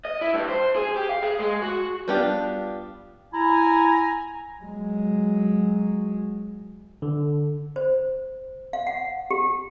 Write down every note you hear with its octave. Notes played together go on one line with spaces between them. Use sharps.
D#5
E4
G2
C5
G#4
G4
F5
G#4
G#3
F#4
G3 B3 D4 F4 G4
E4 G#5 A#5
F#3 G#3
D3
C5
F5
F#5
G4